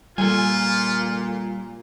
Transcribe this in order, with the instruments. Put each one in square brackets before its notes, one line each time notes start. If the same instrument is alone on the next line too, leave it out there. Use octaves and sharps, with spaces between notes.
[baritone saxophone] A#2 [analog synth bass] G3 [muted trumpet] F4 [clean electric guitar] A4 G#5